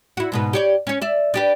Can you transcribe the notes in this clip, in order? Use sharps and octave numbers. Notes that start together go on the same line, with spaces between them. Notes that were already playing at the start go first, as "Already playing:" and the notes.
E4 F#4
G#2 B2 B4
G4 C#5 D5
C#4 C#5
D5 E5
D4 G4 B4